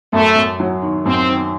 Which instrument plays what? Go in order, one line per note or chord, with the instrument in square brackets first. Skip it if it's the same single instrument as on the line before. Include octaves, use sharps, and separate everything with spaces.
[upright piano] F#2 [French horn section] A3
[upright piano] F#2
F#3
D#3
[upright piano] F#2 [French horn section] C4
[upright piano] D#3